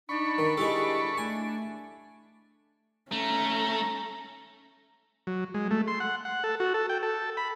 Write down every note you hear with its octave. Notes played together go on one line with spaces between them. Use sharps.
D4 D#4 B5 C#6
D#3
G#3 E4 G4 A4
A3 G#5
A3 C#4 A#5
F#3
G#3
A3
C6
F#5
F#5
A4
F#4
A4
G5
A4
B5